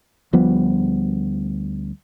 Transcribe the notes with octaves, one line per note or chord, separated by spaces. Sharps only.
D2 F3 G3 B3